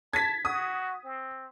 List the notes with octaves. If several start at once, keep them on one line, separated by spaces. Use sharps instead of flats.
A5 G#6 A6 B6
F#4 D#6
C4